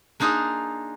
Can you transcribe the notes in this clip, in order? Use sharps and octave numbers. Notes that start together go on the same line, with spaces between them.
A#3 D4 D#4 F4 G#4